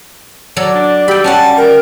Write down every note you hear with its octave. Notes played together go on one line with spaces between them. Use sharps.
F#3 A4 D5
D4
G3 G4 G5 B5 E6
C#4 F#4 F#5 G5 A5
A#4 G5